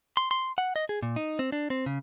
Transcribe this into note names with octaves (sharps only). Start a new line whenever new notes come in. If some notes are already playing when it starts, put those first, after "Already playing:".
C6
C6
F#5
D#5
G#4
A#2
D#4
C4
D4
C4
C#3